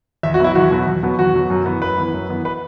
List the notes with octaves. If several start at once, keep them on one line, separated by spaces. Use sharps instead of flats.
E2 E5
F#4
B2 F#3 B3 E4
E2 F#4
B2 F#3 B3
E2
B2 F#3 B3
E2 F#4
B2 F#3 B3
F#2
E3 B3
F#2 B4
E3 B3
F#2
E3 B3
B4